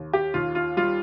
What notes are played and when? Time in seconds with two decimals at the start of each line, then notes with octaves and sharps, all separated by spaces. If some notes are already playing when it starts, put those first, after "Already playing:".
Already playing: D#2
0.13 G4
0.34 D#2 F4
0.55 F4
0.77 G3 F4